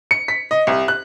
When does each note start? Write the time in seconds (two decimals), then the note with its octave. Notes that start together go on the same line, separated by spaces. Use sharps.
0.11 C#7
0.28 B6
0.51 D#5
0.67 C2
0.88 F#6